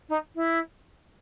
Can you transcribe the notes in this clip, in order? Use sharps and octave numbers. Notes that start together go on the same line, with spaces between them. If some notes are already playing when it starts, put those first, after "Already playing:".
D#4
E4